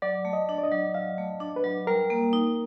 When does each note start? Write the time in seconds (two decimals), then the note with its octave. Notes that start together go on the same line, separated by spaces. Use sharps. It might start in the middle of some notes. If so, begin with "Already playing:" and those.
0.02 F#3 D5
0.25 A3
0.33 D#5
0.49 D4
0.58 D5
0.64 D#5
0.71 F#3
0.94 F#3 F5
1.18 A3
1.40 D4
1.56 B4
1.64 F#3
1.87 G3 A#4
2.10 A#3
2.33 D#4